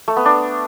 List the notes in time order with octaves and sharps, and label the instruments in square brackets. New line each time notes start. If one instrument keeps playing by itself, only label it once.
[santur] A3
B3
D4